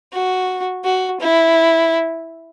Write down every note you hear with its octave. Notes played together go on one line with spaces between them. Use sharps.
F#4
F#4
E4